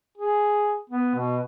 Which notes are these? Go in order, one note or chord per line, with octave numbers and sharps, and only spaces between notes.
G#4
B3
B2